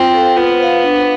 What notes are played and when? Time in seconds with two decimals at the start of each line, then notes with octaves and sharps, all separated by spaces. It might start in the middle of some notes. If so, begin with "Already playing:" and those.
Already playing: C4 F4
0.13 A4 C5 F5
0.36 B3 F4
0.59 C5 F5
0.84 D4